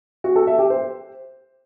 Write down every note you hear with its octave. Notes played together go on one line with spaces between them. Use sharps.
F#4
A4
E5
G4
C5